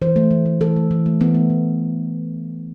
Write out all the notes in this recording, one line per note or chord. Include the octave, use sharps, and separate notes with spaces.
E3 C5
A3
E3
A3
E3 A4
A3
E3
A3
E3 B3
A3
E3